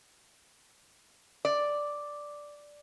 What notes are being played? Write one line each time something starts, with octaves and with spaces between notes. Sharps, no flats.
D5